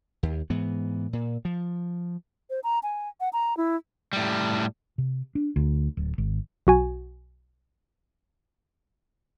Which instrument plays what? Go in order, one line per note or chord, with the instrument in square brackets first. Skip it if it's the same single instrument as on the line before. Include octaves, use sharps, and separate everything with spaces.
[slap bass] D#2
G#2 E3 B3
A#2
F3
[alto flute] C5
A#5
G#5
F#5
A#5
E4
[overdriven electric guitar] A2 G3
[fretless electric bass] C3
D4
D2
D1
G#1
[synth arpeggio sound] B1 F#4 G#5